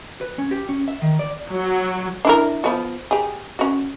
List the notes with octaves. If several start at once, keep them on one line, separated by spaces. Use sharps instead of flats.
B4
C#4
G4
C#4
E5
D#3
D5
F#3
D4 E4 A#4
F3 B3 F#4
G4 G#4
C#4 F#4